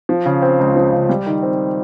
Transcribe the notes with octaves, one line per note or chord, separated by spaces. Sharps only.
F3
C#3
C4
C#2
F3
C#3
G3
D#3
C4